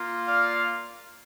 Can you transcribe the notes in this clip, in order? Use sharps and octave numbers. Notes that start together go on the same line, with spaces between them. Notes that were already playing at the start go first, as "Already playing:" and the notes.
Already playing: A#3 F4
D5 F5